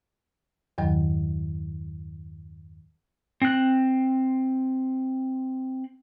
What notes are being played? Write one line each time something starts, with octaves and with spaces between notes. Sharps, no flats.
E2 G2 D#3 F#3
C4 F#6